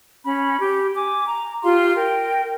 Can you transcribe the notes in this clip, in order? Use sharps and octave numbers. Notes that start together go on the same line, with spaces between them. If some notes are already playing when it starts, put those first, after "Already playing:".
C#4 B5
G4
G#5 D6
A#5
F4 G4 F5 C6
A#4 G5